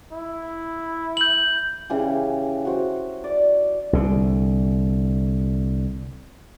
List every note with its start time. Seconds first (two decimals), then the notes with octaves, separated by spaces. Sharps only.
0.12 E4
1.17 G6 F#7
1.90 C#3 E3 G4
2.65 F#4 C5
3.24 D5
3.93 C2 D3